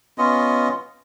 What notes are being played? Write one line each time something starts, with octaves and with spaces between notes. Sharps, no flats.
B3 C#4 F4 D#5